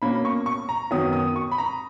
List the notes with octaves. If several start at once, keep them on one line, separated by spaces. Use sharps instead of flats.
B2 A#3 C#4 B5
C#6
C#6
A#5
F#2 D#3 F#3 B3 D#6
D#6
C#6
B5
A#5